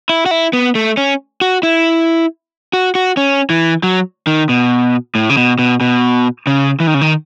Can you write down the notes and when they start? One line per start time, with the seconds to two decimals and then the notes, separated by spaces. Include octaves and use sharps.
0.09 E4
0.26 F#4
0.31 E4
0.53 B3
0.75 A3
0.97 C#4
1.41 F#4
1.63 E4
2.73 F#4
2.95 F#4
3.17 C#4
3.50 E3
3.83 F#3
4.27 D#3
4.49 B2
5.15 A2
5.30 C#3
5.37 B2
5.59 B2
5.81 B2
6.47 C#3
6.80 E3
6.87 D#3
6.94 C#3
7.01 D#3